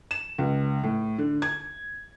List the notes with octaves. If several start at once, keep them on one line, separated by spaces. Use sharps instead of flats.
E7
C#2
A2
D3
G#6